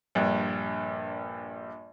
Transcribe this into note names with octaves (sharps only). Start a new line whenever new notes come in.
A#1 G2